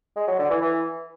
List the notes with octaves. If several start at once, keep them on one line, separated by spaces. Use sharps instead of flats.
G#3
F#3
D3
E3
E3